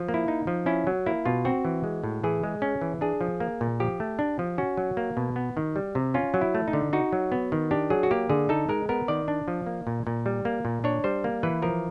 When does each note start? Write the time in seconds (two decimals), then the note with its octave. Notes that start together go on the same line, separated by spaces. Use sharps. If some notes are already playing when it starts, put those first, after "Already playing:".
Already playing: F3
0.08 A#3
0.14 E4
0.28 D#4
0.47 F3
0.66 C#4 E4
0.87 F#3
1.06 A#3 E4
1.25 B2 F4
1.45 C4 F#4
1.65 E3
1.84 G#3
2.04 A2
2.24 E3 G#4
2.44 G#3
2.62 C#4
2.81 E3
3.01 D4 G#4
3.21 F3
3.40 A#3
3.61 A#2
3.80 F3 G4
4.00 A3
4.19 D4
4.39 F3
4.58 C#4 F#4
4.77 F#3
4.97 A#3
5.17 B2
5.36 B3
5.57 D#3
5.76 G3
5.95 C3
6.14 C#4 F4
6.34 F#3
6.41 E4
6.55 A3
6.68 D#4
6.73 D3
6.93 D#4 F#4
7.13 F#3
7.32 B3
7.52 D#3
7.71 D4 G4
7.90 F#3 G#4
8.03 F#4
8.11 A#3 G4
8.29 D3 G#4
8.49 D#4 A4
8.69 G#3 A#4
8.89 B3 A#4
9.08 D#3 D5
9.28 D4
9.48 F3
9.66 A#3
9.87 A#2
10.07 A#2
10.26 G3
10.45 A#3
10.65 A#2
10.84 D4 C#5
11.04 G3 C5
11.24 A#3
11.43 E3 B4
11.62 F3 A#4